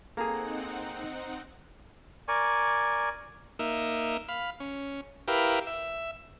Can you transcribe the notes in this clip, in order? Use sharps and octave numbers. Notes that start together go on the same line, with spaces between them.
A#3 C4 D#4 G#4 A4 F#5 A#5
A#4 D5 G#5 C#6
A#3 D#4 E5
F5 B5
C#4
E4 G4 A#4 B4 F5
E5